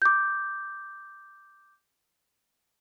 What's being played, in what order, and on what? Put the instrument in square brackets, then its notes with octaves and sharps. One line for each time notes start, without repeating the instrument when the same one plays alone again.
[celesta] D6 G6